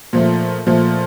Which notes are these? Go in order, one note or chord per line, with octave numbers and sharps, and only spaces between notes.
A#2 F3 A3
A#2 F3 A3